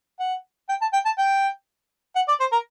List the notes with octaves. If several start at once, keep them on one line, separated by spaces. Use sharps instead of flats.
F#5
G5
A5
G5
A5
G5
F#5
D5
C5
A#4